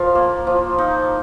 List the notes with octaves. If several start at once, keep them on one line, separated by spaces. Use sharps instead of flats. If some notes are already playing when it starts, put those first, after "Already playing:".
Already playing: F3 F5
A#3
F3
D#4